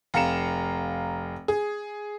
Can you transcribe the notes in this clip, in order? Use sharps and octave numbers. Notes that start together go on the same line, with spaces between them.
F1 F5 A#5 C#7 E7
G#4